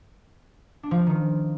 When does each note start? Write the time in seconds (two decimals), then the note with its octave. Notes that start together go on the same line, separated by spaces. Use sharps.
0.83 D4
0.91 F3
0.99 C4
1.07 D#3